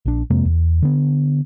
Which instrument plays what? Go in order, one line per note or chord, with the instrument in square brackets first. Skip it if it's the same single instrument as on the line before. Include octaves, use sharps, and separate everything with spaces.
[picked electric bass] A#1 D4
F2 C3 G#3 A#3
E2
D3 B3